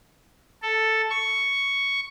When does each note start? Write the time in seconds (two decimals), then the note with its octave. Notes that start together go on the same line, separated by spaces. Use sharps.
0.62 A4
1.10 C#6